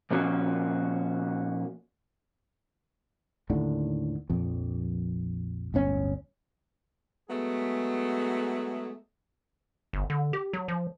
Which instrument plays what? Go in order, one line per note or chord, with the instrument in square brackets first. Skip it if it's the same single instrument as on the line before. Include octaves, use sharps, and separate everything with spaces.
[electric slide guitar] A#2 F3 A#3 C#4 F#4
[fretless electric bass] D#2 A2 D3
A#1 F2
D1 G1 C#4
[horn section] F#3 G#3 A3 B3 G#4
[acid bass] G1
D3
G4
F#3
F3